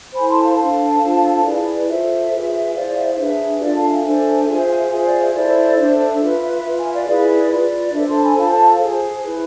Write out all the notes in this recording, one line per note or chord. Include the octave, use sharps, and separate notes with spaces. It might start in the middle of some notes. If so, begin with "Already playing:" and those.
E4 A4 C5 G#5 B5
A5 C6
F5 A5
D4 A4 C5
D4 F4 A4 C5
E4 G#4 B4 D5
F4 A4 C5 E5
F4 G#4 B4
E4 G#4 C5 D5 F5
E5
F5
D4 G#4 B4 E5
D4 F4 A4 D5 F5
F5 A5
E5 G#5
D4 A4 C5
F4 G#4 C5
F4 G#4 C5 E5
D5
E5
E4 A4 C5 D5
D4 A4 C5 E5
F4 B4
F4 B4 E5
E5 G#5
D5 F5
E4 G#4 B4 D5
F4 B4 D5
D4 A4 C5 E5
A5 C6
G#5 B5
F4 A4 C5 F5 A5
F5 A5
F4 G#4 C5
E4 B4